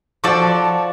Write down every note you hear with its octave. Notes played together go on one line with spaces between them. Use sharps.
F3 F#4 A4 D5 A5